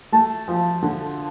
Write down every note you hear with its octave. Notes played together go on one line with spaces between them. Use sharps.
A3 A5
F3
D3